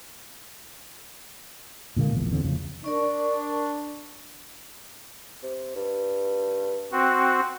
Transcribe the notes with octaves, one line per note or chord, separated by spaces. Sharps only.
A#2 D3 G#3 A#3
E1 A#1 E2
E2 D3 C4
F#1 F2 C#3
D4 A#4 D5 C#6
C3
G2
C4 F#4